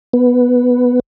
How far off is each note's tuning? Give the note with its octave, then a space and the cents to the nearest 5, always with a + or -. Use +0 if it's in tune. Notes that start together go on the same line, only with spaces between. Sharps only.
B3 +0